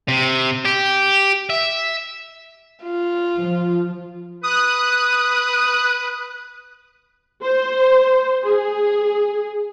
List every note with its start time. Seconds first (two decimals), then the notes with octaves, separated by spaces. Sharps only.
0.08 C3
0.65 G4
1.50 E5
2.82 F4
3.39 F3
4.43 B4 D#6 F#6
7.43 C5
8.45 G#4